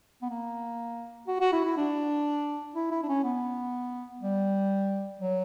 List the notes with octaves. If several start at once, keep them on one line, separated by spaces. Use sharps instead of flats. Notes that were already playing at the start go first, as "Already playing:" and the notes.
B3
A#3
F#4
F#4
E4
E4
D4
E4
E4
D4
C#4
B3
G3
F#3